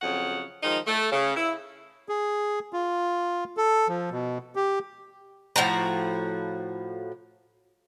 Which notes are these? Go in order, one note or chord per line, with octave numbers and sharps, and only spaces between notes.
F2 C#3 F#3 F#5
D#3 F3 G#3 D#4
A3
C#3
E4
G#4
F4
A4
F3
B2
G4
A2 F3 F#4 A#5